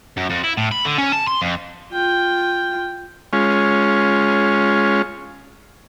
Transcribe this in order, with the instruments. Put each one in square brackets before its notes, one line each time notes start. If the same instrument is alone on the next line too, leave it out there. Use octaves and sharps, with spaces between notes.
[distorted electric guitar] F#2
F2
E4
A2
B5
D3
C#4
A5
C6
F2
[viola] F4 G5
[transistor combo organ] G#3 C#4 F4